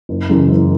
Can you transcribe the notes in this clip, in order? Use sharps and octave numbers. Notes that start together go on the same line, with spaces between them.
F#1
F#2 C#3 E3 G#3
F#1